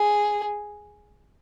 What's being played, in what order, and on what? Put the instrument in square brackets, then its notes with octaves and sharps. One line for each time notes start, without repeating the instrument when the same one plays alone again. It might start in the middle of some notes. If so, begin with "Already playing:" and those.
Already playing: [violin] G#4